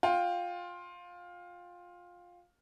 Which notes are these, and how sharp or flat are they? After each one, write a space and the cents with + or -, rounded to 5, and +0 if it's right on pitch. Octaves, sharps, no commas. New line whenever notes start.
F4 +15 G5 +10